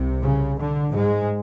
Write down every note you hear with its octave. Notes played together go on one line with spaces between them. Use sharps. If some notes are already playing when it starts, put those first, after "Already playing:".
Already playing: C2 C3
C#3
D3
G#2 G#3